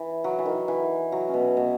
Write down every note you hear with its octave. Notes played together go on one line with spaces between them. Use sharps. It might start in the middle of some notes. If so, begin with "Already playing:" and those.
Already playing: E3
F#3
E3
D#3
E3
F#3
C#4
B2 B3
B2 B3